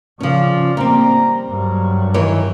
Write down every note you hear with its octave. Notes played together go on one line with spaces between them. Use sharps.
C#3 F3 C#4 D5
G3 A#3 C4 A#5
G2 F#3 A#4
D#3 E3 C#5